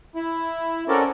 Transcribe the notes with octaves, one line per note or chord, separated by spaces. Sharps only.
E4
C4 C#4 F#4 A4 A#4 D5